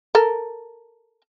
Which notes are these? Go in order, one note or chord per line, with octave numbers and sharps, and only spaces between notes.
A4 A#4